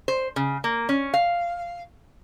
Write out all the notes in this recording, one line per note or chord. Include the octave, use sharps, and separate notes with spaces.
C5
C#3
A#3
C#4
F5